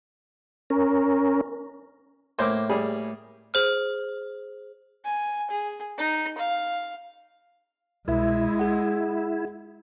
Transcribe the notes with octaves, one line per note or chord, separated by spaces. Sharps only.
C#4 A#4
A2 A#3 C5 D6
G3 G#4
G#4 C5 F6
G#5
G#4
D#4
F5
C2 B2 G#3 E4 E5
G#4 F#5